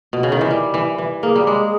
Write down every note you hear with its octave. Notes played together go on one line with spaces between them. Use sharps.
B2
C#3
D#3
E3
G3
E3
E3
A#3 G#4
G3
G#3